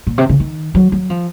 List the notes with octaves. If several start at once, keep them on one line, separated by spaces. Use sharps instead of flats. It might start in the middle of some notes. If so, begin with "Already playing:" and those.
A#2
C3
C#3
D#3
F#3
F#3
F3